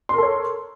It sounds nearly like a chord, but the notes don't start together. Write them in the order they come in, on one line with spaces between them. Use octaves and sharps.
C6 A#4 A4 C#5